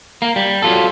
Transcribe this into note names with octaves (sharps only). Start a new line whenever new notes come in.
A#3
G3
F#3 F4 A4